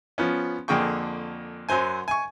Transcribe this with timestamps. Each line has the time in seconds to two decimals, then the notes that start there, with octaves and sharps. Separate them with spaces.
0.18 F3 B3 C#4
0.68 F2 D3 A#3 G#4 G5 C#6
1.69 F#2 F#3 C5 G#5
2.08 G#5 C#6